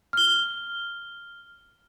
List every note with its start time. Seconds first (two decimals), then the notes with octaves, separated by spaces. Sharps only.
0.13 F6 G7